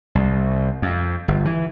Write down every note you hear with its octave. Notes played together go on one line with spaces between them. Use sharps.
C2
F2
G1
E3